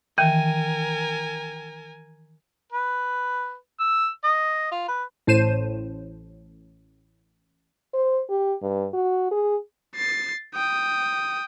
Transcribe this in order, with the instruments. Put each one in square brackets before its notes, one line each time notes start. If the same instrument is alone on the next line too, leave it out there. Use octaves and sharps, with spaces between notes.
[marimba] D#3 E3 [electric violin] A#4 G#5 [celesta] G5 D#7
[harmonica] B4
E6
D#5
F4
B4
[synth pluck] A1 A2 C5 D#7 E7
[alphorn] C5
G4
G2
F#4
G#4
[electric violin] A6 C7
G5 D#6